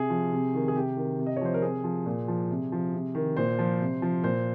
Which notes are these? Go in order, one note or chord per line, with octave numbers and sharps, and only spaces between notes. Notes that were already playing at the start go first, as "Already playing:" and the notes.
Already playing: C3 G#4
F3
C3
D#3
G#4
C3 G4
D#3
C3
D#5
C#5
F3 C5
A#4
C3 G#4
F3
A#2
F3
C3
F3
C3
D#3
A#2 C5
F3
C3
F3
A#2 C5